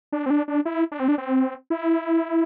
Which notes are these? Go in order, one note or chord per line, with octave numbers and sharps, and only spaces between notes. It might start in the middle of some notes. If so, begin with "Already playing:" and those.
D4
C4
D4
D4
E4
D4
C4
D4
C4
E4